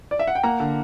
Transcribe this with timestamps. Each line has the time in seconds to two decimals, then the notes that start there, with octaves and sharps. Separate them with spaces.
0.11 D5
0.19 E5
0.27 F#5
0.35 G5
0.43 A#3 F#5 A#5
0.60 D3